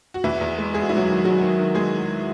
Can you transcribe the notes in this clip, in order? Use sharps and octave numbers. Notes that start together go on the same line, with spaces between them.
F#4
E2 E3 E4
E2
G#3
G#3 G#4
F#4
G#3 E4
F#3 F#4
D#3
F#3 G#3 F#4
D#3
D#3
G#3 G#4